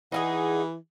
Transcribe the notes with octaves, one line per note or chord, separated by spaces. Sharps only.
E3 D#4 E4 G#4 F#5